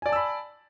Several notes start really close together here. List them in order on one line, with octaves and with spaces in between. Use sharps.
G#5 D5 A5 E6 B5